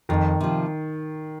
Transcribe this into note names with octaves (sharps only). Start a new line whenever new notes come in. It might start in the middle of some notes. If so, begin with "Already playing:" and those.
F2 D#3
C3 F3